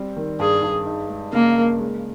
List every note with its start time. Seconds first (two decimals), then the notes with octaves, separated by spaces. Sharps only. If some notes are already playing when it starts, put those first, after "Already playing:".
Already playing: G3 C4
0.17 D#3
0.40 G2 G#4
0.63 G2
0.86 D#4
1.09 G#3
1.33 C#3 A#3
1.56 A#4
1.79 G#3